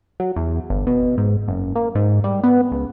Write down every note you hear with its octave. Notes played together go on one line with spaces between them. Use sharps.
F#3
E2
G1
B2
G#2
F#1
A#3
G#2
G3
B3
C#2